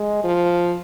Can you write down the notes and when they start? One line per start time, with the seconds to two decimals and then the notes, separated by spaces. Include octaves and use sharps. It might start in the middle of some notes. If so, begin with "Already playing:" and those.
Already playing: G#3
0.24 F3